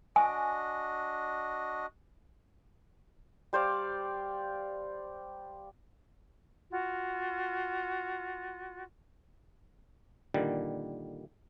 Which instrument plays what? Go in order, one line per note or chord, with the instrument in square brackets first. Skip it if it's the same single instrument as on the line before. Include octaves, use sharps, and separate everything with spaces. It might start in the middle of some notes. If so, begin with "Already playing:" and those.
[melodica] D4 F#4 D#5 [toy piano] G#5
[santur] G3 C5 D5 F5
[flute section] F4 F#4
[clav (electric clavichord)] A#2 D3 D#3 G3